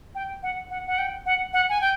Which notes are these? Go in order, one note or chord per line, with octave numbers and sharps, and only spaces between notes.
G5
F#5
F#5
F#5
G5
F#5
F#5
G#5
G5